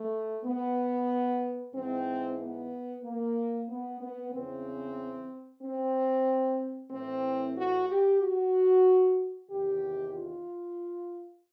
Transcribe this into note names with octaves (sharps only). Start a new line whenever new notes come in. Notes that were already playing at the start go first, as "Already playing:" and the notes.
Already playing: A3
B3
G#2 E3 C4
B3
A#3
B3
B3
E2 C#3 E3 C4
C4
A2 E3 C4
F#4
G4
F#4
E2 C3 D#3 G4
F4